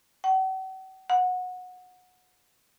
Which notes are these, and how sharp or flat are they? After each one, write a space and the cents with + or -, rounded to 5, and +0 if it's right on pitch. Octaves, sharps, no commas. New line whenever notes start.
F#5 +45
F#5 -20